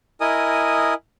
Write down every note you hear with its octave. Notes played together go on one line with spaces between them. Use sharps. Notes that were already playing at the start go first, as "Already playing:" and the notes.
E4 A#4 D#5 G#5 D#6